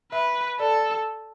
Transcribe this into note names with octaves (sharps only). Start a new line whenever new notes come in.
B4 E5
A4 D5